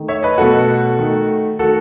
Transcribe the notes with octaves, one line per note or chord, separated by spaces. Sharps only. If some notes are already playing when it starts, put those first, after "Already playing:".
Already playing: D#3 A3
C#5 E5
B4 D#5
B2 A3 F#4 A4
D#3 A3
D#3 A3 F#4 A4